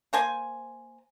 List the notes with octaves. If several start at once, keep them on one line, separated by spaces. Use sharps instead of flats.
A#3 C5 G#5